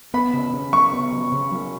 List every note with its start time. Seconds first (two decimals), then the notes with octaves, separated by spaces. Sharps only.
0.14 B3 B5
0.33 C#3
0.54 C#3
0.72 F#3 C#6
0.93 B3
1.12 C#3
1.32 C#3
1.52 F#3